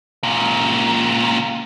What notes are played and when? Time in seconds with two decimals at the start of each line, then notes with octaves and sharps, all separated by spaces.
0.23 C#2 A#2